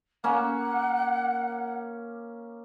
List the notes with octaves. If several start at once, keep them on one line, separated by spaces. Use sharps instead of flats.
A#3 C#4 F#5